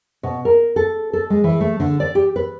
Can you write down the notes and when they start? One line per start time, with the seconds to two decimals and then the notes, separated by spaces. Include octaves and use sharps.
0.23 B2
0.45 A#4
0.76 A4
1.13 A4
1.30 G#3
1.44 E3
1.60 A3
1.80 D3
2.00 D5
2.15 G4
2.36 B4